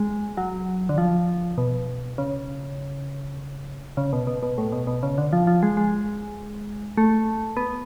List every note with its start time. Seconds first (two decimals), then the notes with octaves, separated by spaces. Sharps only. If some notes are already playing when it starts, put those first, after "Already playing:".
Already playing: G#3
0.37 F#3
0.89 D3
0.98 F3
1.58 B2
2.18 C#3
3.97 C#3
4.13 B2
4.27 B2
4.42 B2
4.58 A2
4.72 B2
4.87 B2
5.03 C#3
5.18 D3
5.33 F3
5.47 F3
5.63 G#3
5.77 G#3
6.97 A3
7.57 B3